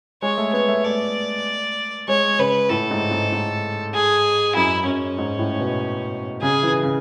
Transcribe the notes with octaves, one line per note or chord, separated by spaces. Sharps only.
G#3 C#5
A3
B3 C#5
A3
A3 D5
G#3 C#5
C#3 B4
A2 A4
G#2
G#2
G#2
G#4
F#2 E4
F#2 C#4
G#2
A2
B2
C#3 G#4
E3
C#3